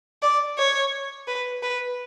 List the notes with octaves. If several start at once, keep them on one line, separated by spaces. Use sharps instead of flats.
D5
C#5
B4
B4